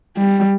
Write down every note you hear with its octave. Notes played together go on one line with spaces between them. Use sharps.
G3